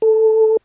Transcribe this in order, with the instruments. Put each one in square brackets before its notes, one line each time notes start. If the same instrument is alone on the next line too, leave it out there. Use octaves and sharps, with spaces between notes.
[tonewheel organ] A4